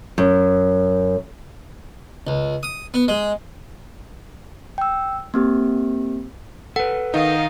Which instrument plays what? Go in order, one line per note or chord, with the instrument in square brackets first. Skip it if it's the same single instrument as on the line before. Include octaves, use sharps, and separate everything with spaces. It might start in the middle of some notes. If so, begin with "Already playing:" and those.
[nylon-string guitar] F#2
[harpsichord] C#2
D#6
B3
G#3
[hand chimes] G5 E6
A#3 C4 G4
[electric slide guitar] A4 B4 [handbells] F#5
[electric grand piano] D#3 D#4 [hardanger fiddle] D#5 F5